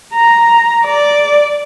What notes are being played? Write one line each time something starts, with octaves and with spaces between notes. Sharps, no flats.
A#5
D5